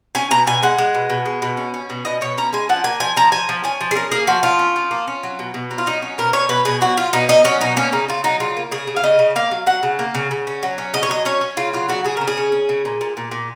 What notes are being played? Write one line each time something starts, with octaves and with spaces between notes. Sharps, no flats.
C#4 G#5
B2 A#5
B2 G#5
G#3 F#5
G#3
B2
B2
G#3
B2
C#4
C#4
B2
B2 D#5
B2 C#5
C#4 A#5
G#3 G#5
F3 F#5
A#3 G#5
F3 G#5
F3 A#5
F3 G#5
F3
C#4 G#5
F3
G#4
C#4 A#4
A#3 G#4
F3 F#4
F3 F4
C#4
F3
A#3
C#4
F#3
B2
B2
F#3
F4
F#3 D#4
C#4
B2 A#4
C#4 C#5
B2 B4
B2 G#4
F#3 F#4
F#3 F4
B2 D#4
C#4 D#4
F#3 C#4
B2 D#4
A#3 C#4
C#3 D#4
C#3 F4
F#3 D#4
C#3 F4
A#3
C#3 G#4
C#3
F5
C#3 D#5
C#3
A#3 F5
F#3
F#3 F#5
C#3
A#3
C#3
C#3
C#4
F#3
C#4
C#3 D#5
C#5
F#3 D#5
C#4 C#5
C#4
C#3 F4
F#3 F4
C#3 F#4
C#3 G#4
C#3 A#4
G#4
C#4
C#4
C#3
A#2
A#2
A#2
A#2